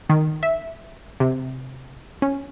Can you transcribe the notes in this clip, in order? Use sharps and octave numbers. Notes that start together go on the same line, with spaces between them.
D#3
E5
C3
C#4